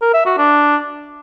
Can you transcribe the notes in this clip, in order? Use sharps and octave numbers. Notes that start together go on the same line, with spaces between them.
A#4
E5
F#4
D4